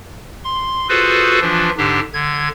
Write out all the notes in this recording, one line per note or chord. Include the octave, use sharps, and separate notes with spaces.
C6
F4 F#4 G#4 A4 B4 C5
E3 F3 D4 F4
G#2 D3 D4 G4
D3 G#6